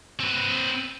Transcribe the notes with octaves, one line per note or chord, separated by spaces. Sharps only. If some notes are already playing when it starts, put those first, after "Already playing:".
C4 B4